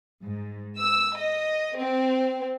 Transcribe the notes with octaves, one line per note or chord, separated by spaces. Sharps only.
G#2
E6
D#5
C4